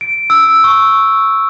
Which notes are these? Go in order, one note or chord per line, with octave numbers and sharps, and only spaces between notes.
D7
E6
C#6